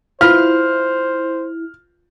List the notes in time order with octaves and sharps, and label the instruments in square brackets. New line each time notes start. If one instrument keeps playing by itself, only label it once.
[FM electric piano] E4 [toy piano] F4 B4 F5 [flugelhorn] C5 [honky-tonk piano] F6